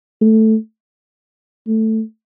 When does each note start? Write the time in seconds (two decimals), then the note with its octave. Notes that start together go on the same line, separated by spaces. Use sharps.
0.21 A3
1.68 A3